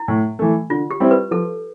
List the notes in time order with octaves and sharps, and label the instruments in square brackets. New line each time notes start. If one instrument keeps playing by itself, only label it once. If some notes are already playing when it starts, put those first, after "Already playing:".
Already playing: [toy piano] E4
[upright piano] A2
E3 A3
[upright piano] D3 [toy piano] F4
[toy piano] G4
[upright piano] G3 C4 E4
[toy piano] B4
[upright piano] F3 [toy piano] A4